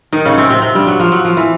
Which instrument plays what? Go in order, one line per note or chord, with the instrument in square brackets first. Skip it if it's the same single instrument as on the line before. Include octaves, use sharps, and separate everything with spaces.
[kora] D#3 D#4
C#3 C#4
C3 C4
C3 C4
C3 C4
G2 G3
F#3
F3
F#3
F3
E3